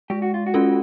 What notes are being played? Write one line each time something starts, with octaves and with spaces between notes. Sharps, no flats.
G#3 G4
F#4
F4
F#4
C#4 F4 A4